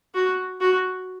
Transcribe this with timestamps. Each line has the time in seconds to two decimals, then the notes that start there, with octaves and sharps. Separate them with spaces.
0.15 F#4
0.61 F#4